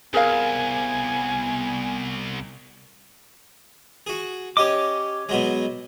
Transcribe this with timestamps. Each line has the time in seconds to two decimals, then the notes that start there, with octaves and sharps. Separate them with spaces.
0.14 C2 B3 G#4 A#4 F5 G#5
4.07 F#4 G#4
4.57 C#4 G4 C#5 D#5 D6
5.29 B2 F#3 G#3